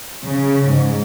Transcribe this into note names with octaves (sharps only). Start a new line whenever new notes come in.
C#3
G#2